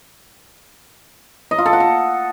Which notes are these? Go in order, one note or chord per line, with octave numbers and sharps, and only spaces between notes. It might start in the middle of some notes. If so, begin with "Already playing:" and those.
D#5
F4
A4
F#5
A4